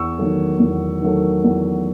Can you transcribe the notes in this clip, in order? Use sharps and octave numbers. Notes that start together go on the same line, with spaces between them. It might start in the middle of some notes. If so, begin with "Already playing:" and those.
Already playing: E2 C#6 E6
D#3 F#3 A3
E2
D#3 F#3 A3
E2